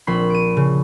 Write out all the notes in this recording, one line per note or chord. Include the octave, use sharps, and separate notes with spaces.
A#1 C4 B5 C6 C7
D7 D#7
C#3